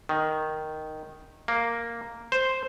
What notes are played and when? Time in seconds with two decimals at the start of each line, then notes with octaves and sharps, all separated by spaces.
0.09 D#3
1.48 A#3
2.32 C5